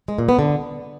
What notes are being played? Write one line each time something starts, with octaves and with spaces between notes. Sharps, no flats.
G#3
A#2
B3
D3